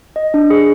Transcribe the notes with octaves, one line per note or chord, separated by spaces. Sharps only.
D#5
D4
G#4